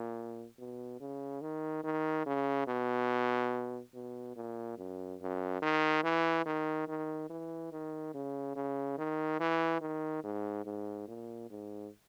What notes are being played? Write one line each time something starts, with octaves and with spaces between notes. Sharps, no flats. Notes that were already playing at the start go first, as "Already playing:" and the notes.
Already playing: A#2
B2
C#3
D#3
D#3
C#3
B2
B2
A#2
F#2
F#2
D#3
E3
D#3
D#3
E3
D#3
C#3
C#3
D#3
E3
D#3
G#2
G#2
A#2
G#2